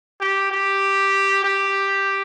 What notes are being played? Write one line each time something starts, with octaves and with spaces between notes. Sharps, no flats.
G4
G4
G4